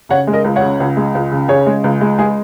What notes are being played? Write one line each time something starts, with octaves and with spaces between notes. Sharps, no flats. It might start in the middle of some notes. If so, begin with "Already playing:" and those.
C#3 C#5 F#5
G#3
A#4 D#5
C#2
C#5 F#5
C#3
C#2
G#3
C#2
C#3
C#3 G#4 C#5
G#3
C#2
G#3
G#3 G#4